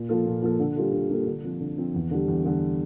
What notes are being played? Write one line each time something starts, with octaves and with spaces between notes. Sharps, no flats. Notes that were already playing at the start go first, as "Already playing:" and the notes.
Already playing: A#2
F3 A#3 F4 A4
A#2
F3 A#3 F4 A4
D3
G3 A#3 F4 A4
D3
G3 A#3 F4 A4
D3
F3 C4
D3
F3 C4
E2
D3 G3
E2
D3 G3